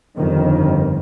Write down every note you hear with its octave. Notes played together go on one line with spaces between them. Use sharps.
G1 F2 D#3